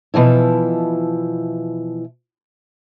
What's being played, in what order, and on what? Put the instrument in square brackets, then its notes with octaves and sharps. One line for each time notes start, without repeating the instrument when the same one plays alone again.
[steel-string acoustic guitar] B2 E3 F3 E4